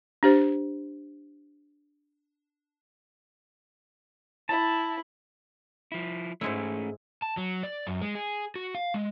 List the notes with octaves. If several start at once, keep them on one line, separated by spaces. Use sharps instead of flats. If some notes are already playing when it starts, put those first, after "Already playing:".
D4 G4 C5
E4 A5
F3 E4
G#2 G#3 A3 C#4 E4
A5
F#3
D5
F#2
G#3
G#4
F#4
F5
G#3